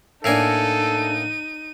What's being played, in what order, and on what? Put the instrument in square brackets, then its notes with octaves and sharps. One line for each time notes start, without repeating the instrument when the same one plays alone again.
[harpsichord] A2 A#3 G#5 [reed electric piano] D4 E6 [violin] D#4 D#7 [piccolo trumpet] A4